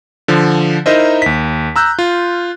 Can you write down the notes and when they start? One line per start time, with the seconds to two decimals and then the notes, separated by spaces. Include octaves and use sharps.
0.28 D3 F3
0.86 D#4 E4 A#4 C5 D#5 E5
1.22 D#2 B6
1.76 A#5 E6 F#6 G6
1.99 F4